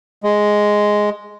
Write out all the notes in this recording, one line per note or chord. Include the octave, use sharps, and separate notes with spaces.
G#3